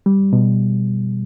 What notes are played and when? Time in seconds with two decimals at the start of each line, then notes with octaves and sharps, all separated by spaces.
0.06 G3
0.33 B2